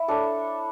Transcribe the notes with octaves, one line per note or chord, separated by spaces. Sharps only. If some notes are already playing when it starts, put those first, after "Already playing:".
Already playing: E4
D4 A4 C#5